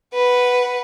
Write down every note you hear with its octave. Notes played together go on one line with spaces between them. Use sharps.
B4 F#5